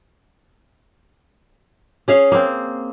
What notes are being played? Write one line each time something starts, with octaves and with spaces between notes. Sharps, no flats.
C#4 G#4 F5
A#3 C4